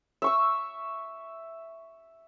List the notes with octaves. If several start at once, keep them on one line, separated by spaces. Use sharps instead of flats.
E5 C#6 E6